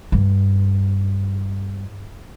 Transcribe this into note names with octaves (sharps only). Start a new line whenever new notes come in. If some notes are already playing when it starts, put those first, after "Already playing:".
G2